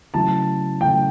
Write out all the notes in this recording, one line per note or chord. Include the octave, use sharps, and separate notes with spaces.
C#3 F#3 A3 E4 A5
C#3 F#3 A3 E4 G5